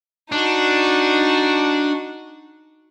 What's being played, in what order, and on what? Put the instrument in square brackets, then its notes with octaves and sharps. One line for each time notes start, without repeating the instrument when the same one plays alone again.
[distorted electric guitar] D4 [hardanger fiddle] D#4 F#4